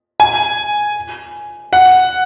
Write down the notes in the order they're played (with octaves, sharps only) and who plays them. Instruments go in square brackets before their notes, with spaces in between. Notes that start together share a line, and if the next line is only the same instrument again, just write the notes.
[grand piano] G#5
F#5